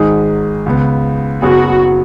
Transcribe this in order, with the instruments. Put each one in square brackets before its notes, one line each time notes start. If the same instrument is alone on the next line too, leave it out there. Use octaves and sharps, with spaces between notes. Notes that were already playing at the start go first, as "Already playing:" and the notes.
Already playing: [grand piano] G#1 G#2 G#3 D#4 G#4
C#2 C#3 B3
[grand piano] F#1 F#2 F#3 B3 G#4 [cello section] F#4